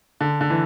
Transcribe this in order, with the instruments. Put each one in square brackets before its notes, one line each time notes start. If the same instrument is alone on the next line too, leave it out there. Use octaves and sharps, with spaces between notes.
[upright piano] D3
D3
E3